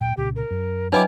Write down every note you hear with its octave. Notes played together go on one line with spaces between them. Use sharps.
D1 A#2 G5
C2 A#2 C#3 G4
A#4
F#2
F#3 D4 E4 B4 D#5 G5 D6